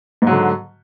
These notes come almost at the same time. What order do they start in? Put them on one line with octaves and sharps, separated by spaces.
G#2 F#3 D3